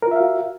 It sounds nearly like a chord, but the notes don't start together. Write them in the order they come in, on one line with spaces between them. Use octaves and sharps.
A#4 F4 E5 F5 F#4